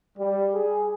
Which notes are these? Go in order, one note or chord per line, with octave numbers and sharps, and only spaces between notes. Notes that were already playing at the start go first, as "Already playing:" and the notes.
G3
G#4